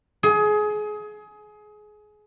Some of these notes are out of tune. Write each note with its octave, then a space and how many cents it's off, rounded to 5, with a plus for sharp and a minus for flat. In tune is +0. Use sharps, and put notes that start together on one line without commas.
G#4 +25